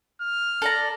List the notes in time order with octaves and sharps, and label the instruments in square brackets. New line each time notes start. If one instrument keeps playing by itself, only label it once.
[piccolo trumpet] F6
[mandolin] A4 D5 A#5